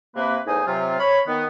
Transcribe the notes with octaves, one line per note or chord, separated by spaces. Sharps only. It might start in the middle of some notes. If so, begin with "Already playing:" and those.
C3 A#3 B4
E2 A2 D#4 C5 G#5 D#6
C3 F#3 F4
C#5 B5
D#3 B3